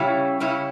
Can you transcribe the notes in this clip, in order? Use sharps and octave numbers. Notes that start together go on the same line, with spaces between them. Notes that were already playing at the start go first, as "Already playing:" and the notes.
Already playing: C#3 G3 C#4 E4
C#3 G3 C#4 E4